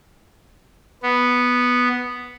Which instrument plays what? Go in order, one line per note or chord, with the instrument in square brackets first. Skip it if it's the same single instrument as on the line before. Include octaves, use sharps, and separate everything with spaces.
[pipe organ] B3